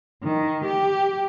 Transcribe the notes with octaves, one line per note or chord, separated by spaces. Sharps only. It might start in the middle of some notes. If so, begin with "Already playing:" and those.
D#3
G4